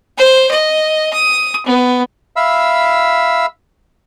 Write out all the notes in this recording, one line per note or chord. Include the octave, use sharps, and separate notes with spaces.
C5
D#5
D#6
B3
E5 F5 B5 E6